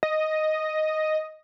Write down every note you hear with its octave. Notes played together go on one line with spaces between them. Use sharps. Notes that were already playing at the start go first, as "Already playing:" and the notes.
D#5